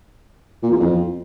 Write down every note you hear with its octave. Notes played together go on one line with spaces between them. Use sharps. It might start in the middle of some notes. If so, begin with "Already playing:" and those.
A#2
E2
F2